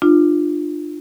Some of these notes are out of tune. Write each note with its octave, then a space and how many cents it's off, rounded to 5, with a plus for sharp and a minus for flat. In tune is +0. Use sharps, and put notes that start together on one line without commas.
D4 +35 F4 +0